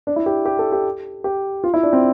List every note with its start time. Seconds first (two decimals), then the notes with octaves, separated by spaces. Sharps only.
0.07 D4
0.16 E4
0.26 G4
0.46 G4
0.59 A4
0.72 G4
1.24 G4
1.64 F4
1.74 E4
1.83 D4
1.93 C4